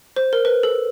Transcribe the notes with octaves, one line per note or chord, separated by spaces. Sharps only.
C5
A#4
B4
A4